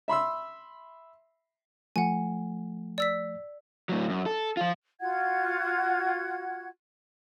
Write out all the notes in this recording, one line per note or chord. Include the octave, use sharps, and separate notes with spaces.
E5 B5 C6 E6
F3 A3 F#5 G#5
D5 E6 B6
A2 F#3
F#2
A4
F3 F4
F4 F#4 F#5 G#6